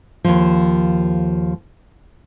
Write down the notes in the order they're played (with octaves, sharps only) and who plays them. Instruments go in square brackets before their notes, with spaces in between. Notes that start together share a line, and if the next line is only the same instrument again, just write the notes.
[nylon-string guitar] D#2 F3